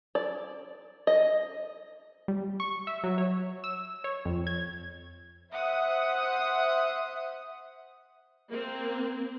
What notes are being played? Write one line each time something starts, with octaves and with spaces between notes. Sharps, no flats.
D5
D#5
G3
C#6
E5
F#3
C#5
E6
C#5
F2
G#6
C5 E5 F#5 D#6
A#3 C4